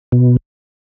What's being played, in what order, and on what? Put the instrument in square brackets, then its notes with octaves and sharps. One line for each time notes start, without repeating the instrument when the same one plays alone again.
[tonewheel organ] B2